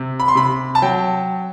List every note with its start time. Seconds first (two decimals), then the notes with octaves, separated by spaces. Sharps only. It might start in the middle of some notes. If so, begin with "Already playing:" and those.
Already playing: C3
0.20 B5
0.28 C6
0.35 C3 B5
0.75 A5
0.82 F#3 G5